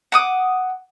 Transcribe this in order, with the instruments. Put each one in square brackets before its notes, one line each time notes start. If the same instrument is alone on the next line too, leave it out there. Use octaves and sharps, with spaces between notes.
[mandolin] F#5 D6 D#6